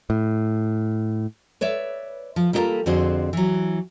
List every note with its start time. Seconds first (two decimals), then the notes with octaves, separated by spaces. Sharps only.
0.10 A2
1.61 B4 C#5 D5 E5
2.36 F3
2.53 G3 A#3 E4 F4 A4 A#4
2.86 F2 D3 C4 F#4 G#4 C5
3.33 E3 F#3